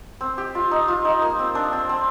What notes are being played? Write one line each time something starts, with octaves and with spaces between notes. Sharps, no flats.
C4
G4
F4
D#4
F4
D#4
A#3
C4
D4
C4
C4